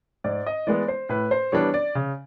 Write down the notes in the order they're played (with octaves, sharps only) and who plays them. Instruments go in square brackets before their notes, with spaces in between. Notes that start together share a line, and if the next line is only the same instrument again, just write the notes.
[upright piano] G#2 [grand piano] D5
[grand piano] D#5
[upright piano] E3 G#3 B3 [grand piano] D5
[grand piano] C5
[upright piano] A2 [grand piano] B4
[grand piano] C5
[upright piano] E3 G3 B3 D4 [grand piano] C#5
[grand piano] D5
[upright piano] C#3